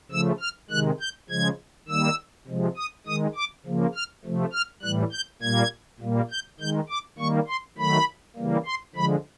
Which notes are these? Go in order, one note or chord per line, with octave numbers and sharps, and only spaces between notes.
C#3 F3 A3 E6
F6
C3 D#3 G#3 F#6
G6
C#3 F3 G#3 G#6
D#3 G3 A#3 E6
C3 F3 G#3
D#6
D#3 G#3 D#6
D6
C#3 F3 A#3
F6
C3 F3 A3
F6
A2 E3 G3 F#6
G6
A#2 G3 A#3 G#6
A#2 G3 A#3
G6
D#3 G#3 G6
D6
D#3 G3 A#3 C#6
C6
D#3 F#3 A3 B5
C#3 E3 G3 A#3
C6
D3 F3 G#3 B5